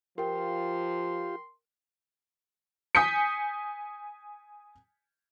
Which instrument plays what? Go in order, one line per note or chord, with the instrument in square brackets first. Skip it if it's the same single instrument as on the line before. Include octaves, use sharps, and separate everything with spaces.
[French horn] F3 [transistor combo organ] F4 G4 [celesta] A#4 G5 [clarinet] C6
[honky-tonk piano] G#5 D#6 G6 B6 C#7